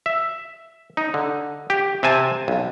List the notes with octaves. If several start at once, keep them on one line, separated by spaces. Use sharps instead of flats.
E5
D#4
D3
G4
C3 C4 G#5 A5
B1